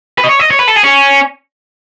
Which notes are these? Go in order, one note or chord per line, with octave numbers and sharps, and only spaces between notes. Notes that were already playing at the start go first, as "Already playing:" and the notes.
B4
D#5
C#5
D#5
C#5
B4
A4
G#4
C#4